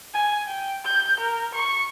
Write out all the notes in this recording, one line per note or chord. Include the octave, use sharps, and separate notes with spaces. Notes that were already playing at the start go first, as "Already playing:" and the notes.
G#5
G5
G6
A#4
C#6